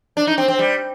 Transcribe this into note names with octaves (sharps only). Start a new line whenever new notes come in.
D4
D#4
C4
C4
G3